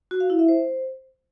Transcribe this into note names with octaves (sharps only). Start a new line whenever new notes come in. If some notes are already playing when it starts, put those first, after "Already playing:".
F#4
F5
E4
E5
C5